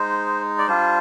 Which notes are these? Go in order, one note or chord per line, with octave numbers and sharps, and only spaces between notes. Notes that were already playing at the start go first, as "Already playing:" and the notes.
Already playing: G#3 D#4 C5
D5
G3 D4 F4 C5